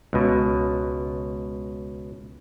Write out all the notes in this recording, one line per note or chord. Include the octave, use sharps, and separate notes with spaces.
C#2 B2